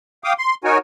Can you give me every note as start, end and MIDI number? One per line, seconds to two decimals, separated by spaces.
0.24 0.33 77
0.24 0.33 79
0.24 0.33 86
0.24 0.33 87
0.38 0.55 84
0.64 0.78 63
0.64 0.78 66
0.64 0.78 70
0.64 0.78 73
0.64 0.78 80